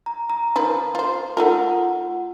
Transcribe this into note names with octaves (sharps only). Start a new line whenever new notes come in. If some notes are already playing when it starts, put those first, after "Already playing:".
A#5
A#5
D#3 F3 B4
F4 C5
A3 D#4 F4 A#4 F#5